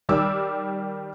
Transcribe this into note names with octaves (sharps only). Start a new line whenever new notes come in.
D#3 G3 D5 D6 E6